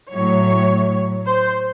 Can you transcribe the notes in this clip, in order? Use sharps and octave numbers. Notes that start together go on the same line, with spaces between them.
A2 F#3 C#5
C5